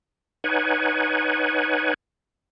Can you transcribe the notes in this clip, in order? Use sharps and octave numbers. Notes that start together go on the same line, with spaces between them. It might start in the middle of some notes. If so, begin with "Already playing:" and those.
D#4 B4 C#5 F#5 G#5